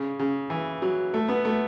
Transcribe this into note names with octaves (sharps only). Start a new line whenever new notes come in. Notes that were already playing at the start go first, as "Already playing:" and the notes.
Already playing: C#3
C#3
E3
F#3
A3
B3
A3